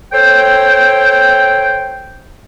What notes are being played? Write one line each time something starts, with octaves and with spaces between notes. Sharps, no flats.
A4 C5 C#5 G5